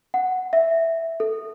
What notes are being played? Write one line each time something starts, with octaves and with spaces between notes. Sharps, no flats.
F#5
E5
A4